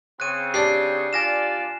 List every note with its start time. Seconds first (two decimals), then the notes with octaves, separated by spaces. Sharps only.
0.20 C#3 C4 F#6 D#7
0.54 D4 G4 C7
1.13 F4 D5 G#5 A#6 E7